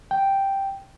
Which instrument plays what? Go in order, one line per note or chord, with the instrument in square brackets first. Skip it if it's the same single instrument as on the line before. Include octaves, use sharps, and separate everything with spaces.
[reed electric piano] G5